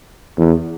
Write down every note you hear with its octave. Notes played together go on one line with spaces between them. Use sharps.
E2